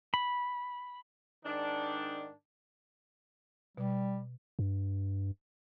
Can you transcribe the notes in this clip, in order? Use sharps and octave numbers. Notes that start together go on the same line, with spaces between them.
B5
G#2 D#3 D4
B2 G3
G2